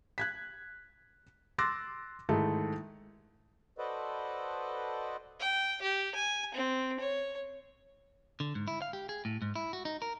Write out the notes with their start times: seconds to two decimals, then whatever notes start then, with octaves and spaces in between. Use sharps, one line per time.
0.18 F#6 G#6 B6
1.58 C6 D6 E6 F#6 A6 A#6
2.29 G#2 D#3 A3 E4
3.78 F#4 A4 B4 C5 D5 D#5
5.40 G5
5.82 G4
6.15 G#5
6.54 C4
7.00 C#5
8.40 D3
8.55 G#2
8.68 E4
8.82 F5
8.93 G4
9.09 G#4
9.25 A2
9.42 G#2
9.56 E4
9.73 F#4
9.85 D#4
10.02 A#4